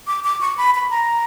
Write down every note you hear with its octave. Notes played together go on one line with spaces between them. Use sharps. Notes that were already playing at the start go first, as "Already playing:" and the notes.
D6
D6
C#6
B5
B5
A#5